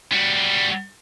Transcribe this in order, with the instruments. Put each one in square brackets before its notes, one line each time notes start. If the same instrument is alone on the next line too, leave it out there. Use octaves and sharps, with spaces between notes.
[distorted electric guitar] G3 F#4